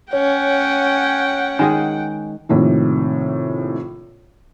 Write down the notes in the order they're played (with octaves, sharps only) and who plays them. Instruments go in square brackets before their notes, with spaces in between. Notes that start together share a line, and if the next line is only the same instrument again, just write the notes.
[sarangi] C#4 [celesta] C#5 [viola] F#5 G5
[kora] D#3 G#3 G#4 [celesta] G#5
[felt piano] A#1 A2 C3 D#3